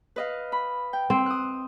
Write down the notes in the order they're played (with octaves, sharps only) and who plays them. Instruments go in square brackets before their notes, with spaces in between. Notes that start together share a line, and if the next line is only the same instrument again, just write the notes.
[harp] B4 D#5 F5
B5
G5
[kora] C4
[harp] D#6 F#6